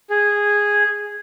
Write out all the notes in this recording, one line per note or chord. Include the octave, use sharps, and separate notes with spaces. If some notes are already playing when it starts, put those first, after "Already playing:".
G#4